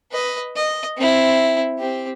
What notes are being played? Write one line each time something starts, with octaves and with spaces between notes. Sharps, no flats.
B4 D#5
D#5
C4 E4
C4 G4